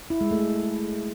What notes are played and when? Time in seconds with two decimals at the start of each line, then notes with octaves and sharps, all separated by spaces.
0.10 E4
0.21 G#3
0.31 A3